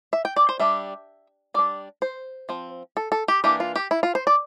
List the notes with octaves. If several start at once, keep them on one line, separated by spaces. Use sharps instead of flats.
E5
G5
D5
C5
G3 D4 E5
G3 D4 D5
C5
F3 C4
A4
A4
G4
E3 A#3 D4 G4
F4
G4
E4
F4
C5
D5